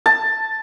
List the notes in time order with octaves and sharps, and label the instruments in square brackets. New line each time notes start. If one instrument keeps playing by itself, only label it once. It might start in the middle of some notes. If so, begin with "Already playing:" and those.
[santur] A5